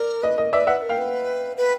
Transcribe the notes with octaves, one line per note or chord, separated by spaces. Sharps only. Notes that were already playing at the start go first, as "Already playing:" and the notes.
Already playing: A#4 D5
B4 D#5
A#4 D#5
B4 D5 E5
B4 E5 F#5
A#4
F5 G5
B4
B4